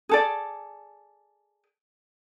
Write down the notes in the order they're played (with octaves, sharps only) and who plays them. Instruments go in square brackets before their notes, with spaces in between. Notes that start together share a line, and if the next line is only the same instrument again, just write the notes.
[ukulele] G#4 A4 D5